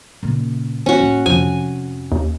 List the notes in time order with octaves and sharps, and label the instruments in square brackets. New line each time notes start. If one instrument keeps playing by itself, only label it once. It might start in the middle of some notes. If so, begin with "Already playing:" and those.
[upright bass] A#2 C#3
[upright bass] E3 [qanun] C#4 F#4
[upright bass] A2 A#3
[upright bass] F2 C3 [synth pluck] F3 [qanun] G#5
[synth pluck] D#2